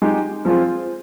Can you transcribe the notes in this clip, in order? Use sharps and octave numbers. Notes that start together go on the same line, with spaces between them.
G#3 D#4 G4
F3 G#3 C4 F4 G#4